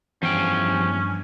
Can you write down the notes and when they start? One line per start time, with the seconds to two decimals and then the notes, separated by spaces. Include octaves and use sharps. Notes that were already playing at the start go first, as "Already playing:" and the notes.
0.23 E2 G2 F3 C#4 G5 G#5